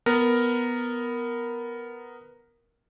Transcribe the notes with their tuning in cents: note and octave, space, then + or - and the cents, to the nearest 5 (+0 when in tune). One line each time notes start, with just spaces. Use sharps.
B3 +0 A#4 +0